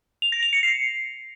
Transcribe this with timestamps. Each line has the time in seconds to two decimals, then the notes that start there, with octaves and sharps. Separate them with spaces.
0.22 F7
0.32 A#6
0.43 F7
0.53 C#7
0.63 C7